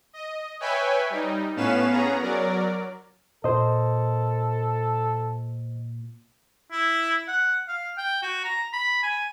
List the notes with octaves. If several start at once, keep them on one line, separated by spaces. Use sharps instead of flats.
D#5
B4 C#5 E5 G5 G#5 B5
G3 D#4
A2 B3 C#4 B4 F5 E7
B3 C#4 G#4 A#5
F#3 A#4 D5
A#2 A4 C5 D#5
E4
F#5
F5
G5
F#4
A#5
B5
G#5